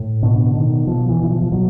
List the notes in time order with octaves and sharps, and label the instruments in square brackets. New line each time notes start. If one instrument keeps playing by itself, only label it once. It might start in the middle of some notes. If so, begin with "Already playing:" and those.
Already playing: [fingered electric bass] A2
B2 D3
B2 D#3
B2 F3
E3
B2 E3
F3
F3
B2 F#3